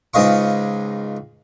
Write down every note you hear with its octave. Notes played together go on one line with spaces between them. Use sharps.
C#2 G#2 D#5 F5 C#6